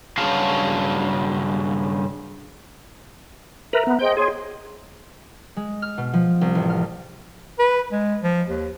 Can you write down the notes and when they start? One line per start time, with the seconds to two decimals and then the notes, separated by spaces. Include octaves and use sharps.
0.18 G2 C#3 F#3 F#4 F5 A5
3.73 A#4 B4 E5 A#5
3.87 B3
3.99 G#4 C5 D#5 G5
4.17 G#4 C#5 C6 G#6
5.57 G#3
5.82 F6
5.97 B2
6.13 F3
6.41 C2
6.55 A1
6.70 F6
7.59 B4
7.92 G#3
8.23 F3
8.48 D#2